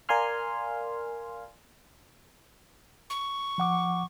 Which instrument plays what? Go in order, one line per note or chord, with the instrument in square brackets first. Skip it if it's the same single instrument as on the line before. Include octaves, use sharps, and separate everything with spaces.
[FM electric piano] A#4 D5 F5 G#5 C6 F6
[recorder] C#6
[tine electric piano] F3 F#5 D6